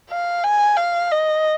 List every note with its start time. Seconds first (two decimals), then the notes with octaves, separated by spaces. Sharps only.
0.10 F5
0.44 G#5
0.77 F5
1.11 D#5